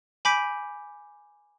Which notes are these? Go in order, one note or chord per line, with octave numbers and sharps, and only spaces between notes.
G#5 B5 D6 G6 B6 D7